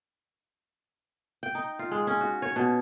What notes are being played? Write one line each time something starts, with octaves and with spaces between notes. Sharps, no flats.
G5
D#4
F4
G#3
C#4
F#4
C#5
B2